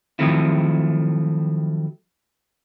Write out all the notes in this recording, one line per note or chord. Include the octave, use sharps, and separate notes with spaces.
D#3 F3 F#3 A3 C4 E4